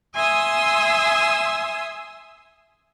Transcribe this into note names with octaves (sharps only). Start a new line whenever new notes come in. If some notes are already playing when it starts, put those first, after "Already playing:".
E5 G#5 C6 D#6 E6